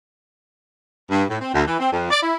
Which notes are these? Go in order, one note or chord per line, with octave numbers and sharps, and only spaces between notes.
G2
A2
C4
D2
E3
C4
F2
D5
E4